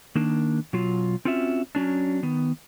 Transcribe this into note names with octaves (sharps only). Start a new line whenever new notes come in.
D#3 A#3 D4
B2 F#3 F4
C4 C#4 F4 F#4 E5
F#3 C#4 D4
D#3 B3